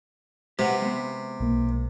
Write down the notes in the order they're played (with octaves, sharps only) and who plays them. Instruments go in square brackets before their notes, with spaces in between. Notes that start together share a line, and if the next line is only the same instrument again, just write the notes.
[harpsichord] C3 [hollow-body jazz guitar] G4 B4 F#5
[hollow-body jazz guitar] G#3 B3
[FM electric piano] B1 A#3